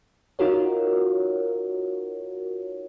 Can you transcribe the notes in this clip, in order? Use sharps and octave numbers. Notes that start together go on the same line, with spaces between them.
D#4 F4 F#4 A#4 C#5